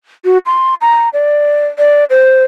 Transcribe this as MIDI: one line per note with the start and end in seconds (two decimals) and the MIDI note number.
0.25 0.38 66
0.46 0.75 84
0.81 1.09 82
1.13 1.67 74
1.78 2.05 74
2.10 2.45 72